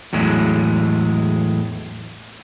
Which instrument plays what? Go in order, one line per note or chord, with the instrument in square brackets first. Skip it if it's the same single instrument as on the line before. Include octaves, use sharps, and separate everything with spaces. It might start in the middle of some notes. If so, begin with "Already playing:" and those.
[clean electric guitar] E2 A2 F#3 G#3